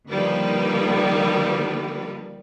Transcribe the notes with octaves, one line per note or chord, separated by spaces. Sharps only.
D3 D#3 F3 G3 A#3 B4